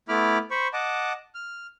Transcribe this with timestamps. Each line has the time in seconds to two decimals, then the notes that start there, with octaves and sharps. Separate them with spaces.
0.09 A3 B3 E4 B5 D6 F6
0.51 C5 B5 C#6
0.73 D#5 F#5 A5 D6
1.35 F6